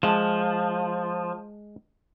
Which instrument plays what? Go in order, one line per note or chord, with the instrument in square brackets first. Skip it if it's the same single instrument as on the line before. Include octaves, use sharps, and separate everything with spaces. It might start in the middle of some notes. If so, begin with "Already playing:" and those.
[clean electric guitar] F3 [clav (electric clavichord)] G#3 A5